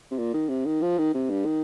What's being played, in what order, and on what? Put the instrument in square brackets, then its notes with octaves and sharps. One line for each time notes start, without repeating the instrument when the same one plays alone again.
[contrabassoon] C3
A#2
D#3
C3
D#3
F3
D#3
C3
G2
D#3